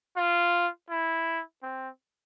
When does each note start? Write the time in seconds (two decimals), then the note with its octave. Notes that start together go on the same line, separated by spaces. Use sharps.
0.17 F4
0.90 E4
1.63 C4